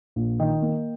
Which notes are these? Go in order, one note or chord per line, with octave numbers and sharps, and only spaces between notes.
A#1
D#3 D#5 G5
A#3